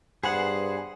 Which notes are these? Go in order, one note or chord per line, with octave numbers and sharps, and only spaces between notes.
G2 B3 G#4 C5 F#5